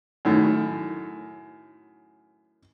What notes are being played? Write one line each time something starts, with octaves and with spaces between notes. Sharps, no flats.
F#2 A2 D#3